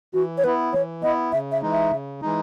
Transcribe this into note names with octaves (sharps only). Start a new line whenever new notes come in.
E3 F#4
C#5
B3 E4 B4
E3 C#5
B3 E4 D#5
C#3 E5
E5
E3 G#3 D#4
E5
C#3
E3 G#3 D#4